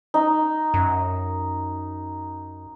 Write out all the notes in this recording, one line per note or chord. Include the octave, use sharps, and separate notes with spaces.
D#4
F#2